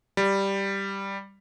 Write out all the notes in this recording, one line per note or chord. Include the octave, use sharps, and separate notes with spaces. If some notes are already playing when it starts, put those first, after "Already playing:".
G3